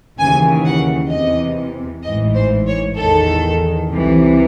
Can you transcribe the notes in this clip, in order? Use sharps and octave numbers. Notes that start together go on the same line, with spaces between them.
D#2 C#3 E3 G#5
F#5
E2 C3 E3 D#5
A1 G#2 E3 D#5
C5
C#5
E2 D#3 A4
C2 C3 E3